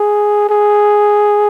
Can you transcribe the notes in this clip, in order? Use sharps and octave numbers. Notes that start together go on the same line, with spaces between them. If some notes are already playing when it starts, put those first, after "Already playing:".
Already playing: G#4
G#4